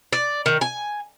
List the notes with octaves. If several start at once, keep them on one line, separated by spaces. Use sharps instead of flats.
D5
D#3
G#5